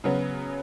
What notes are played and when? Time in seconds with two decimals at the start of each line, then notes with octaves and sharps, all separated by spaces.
0.04 C#3 F#3 B3